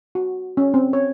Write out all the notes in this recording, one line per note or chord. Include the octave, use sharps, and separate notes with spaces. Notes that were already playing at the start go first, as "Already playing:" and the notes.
F#4
C#4
C4
C#5